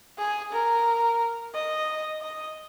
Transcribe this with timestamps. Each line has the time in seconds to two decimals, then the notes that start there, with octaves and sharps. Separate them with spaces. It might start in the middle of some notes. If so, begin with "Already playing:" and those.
0.18 G#4
0.52 A#4
1.55 D#5
2.22 D#5